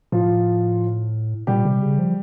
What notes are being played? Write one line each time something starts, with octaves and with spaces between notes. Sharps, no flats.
A2 F3 F4
A#2 G3 G4
C3
C#3
F3